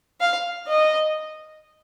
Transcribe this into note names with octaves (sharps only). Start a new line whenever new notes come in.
F5
D#5